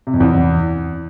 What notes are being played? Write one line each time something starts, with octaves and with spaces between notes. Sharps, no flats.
C3
F2
E2